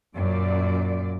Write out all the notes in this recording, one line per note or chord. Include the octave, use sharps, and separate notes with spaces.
F#2 A#2 D5